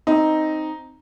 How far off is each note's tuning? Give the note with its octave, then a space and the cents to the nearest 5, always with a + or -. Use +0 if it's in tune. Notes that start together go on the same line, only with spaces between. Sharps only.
C4 +0 D#4 +0